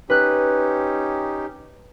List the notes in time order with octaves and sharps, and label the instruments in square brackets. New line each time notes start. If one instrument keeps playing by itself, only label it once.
[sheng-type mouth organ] C#4 D#4 G4 [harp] B4 F#6